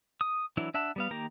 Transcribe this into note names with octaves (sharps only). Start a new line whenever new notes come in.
D#6
E3 F#3 D4 E4
D4 E5 F#5 A5
G3 B3 F5
D#3 A#3 G4 A#5